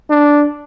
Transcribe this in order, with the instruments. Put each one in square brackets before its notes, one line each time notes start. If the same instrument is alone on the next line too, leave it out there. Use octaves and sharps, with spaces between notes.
[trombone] D4